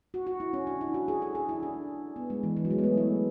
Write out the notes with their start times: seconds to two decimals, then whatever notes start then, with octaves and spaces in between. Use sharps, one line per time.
0.14 F#4
0.27 F#4
0.40 E4
0.53 C#4
0.67 D4
0.81 E4
0.94 F#4
1.08 G#4
1.22 A4
1.35 G#4
1.49 E4
1.63 D4
2.16 B3
2.30 G#3
2.43 E3
2.57 E3
2.65 F#3
2.71 G#3
2.79 B3
2.83 A3
2.97 E4